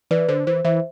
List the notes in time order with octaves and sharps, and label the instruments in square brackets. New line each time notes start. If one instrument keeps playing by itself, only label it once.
[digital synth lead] E3 [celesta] B4 D5
[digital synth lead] D3 [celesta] C5
[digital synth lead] E3 [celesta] C5
[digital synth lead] E3 [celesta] C5 E5